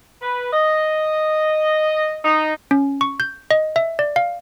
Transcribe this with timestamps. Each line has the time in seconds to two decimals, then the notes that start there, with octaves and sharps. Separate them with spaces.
0.22 B4
0.53 D#5
2.24 D#4
2.71 C#4
3.01 C#6
3.20 G6
3.51 D#5
3.76 E5
3.99 D5
4.16 F5